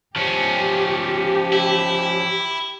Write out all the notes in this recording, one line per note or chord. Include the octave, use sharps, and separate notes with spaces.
F3 C#4 G4
E4